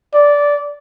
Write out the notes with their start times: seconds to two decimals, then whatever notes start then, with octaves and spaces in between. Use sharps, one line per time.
0.14 D5